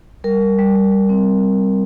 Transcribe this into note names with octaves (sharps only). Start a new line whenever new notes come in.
G3 A#4
G3
G3
G3
G3
C4